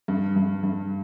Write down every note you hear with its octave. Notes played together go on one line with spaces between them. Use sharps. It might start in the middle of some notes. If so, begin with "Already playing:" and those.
G2
G2
G2